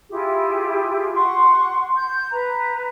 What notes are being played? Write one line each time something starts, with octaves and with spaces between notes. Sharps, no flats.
E4 F4 G4 G#4
F#5 C6 C#6
G6
B4 A#5